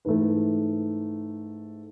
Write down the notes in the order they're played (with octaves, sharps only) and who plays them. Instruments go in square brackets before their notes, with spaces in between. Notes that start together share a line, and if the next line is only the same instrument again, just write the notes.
[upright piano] G#2 E3 A3 B4